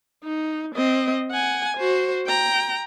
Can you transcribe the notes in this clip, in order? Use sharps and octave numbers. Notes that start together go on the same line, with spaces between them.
D#4
C4 D#5
F#5 G#5
F#4 C5
G5 A#5